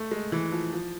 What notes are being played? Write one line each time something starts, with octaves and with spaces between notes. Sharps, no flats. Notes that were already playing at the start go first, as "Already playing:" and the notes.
Already playing: A3
G#3
E3
F3
F3